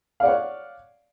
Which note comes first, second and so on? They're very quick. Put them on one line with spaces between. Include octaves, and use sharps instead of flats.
F5 D5 F#5 C#5